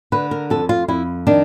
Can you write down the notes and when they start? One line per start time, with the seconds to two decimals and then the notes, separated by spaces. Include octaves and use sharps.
0.12 D3 B4
0.31 A#4
0.50 F2 A4
0.69 F4
0.88 F2 E4
1.27 D#3 D4